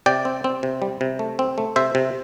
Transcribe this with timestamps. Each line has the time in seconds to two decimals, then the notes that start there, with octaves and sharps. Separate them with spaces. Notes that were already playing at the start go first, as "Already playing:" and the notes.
0.06 C3 D5 G5
0.25 C4
0.44 C4
0.63 C3
0.82 G3
1.01 C3
1.19 A3
1.39 C4
1.58 A3
1.76 C3 C5 E5
1.95 C3